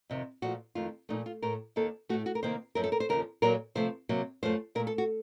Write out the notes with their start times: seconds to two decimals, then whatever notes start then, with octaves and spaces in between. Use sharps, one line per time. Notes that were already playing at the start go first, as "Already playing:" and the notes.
0.10 F2 C3 D#3
0.42 A#2 F3 A3 F#4
0.75 F2 D#3 A3 F4
1.09 A#2 F3 A3 D#4
1.26 F4
1.42 A2 A3 A#4
1.76 D#2 D#3 A#3 A4
2.09 A3 F#4
2.13 A2
2.26 F#4
2.35 A#4
2.43 C3 D#3 A#3 C5
2.75 F#2 F3 A3 A#4
2.84 A4
2.92 A#4
3.00 C5
3.09 D#2 C#3 F3 A#4
3.42 A#2 F#3 A#3 A#4
3.75 C3 F3 A3 C5
4.09 C3 F#3 A#3
4.43 F#2 F3 A3 C5
4.75 A#2 A#4
4.80 A3
4.87 A4
4.98 F#4